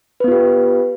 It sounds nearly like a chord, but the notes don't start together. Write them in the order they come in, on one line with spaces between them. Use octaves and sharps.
B4 B3 F4 G4